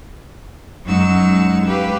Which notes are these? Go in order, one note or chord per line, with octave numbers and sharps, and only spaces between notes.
F#2 F#3 G#3 D#4 F#5 E6
G4 B4 F5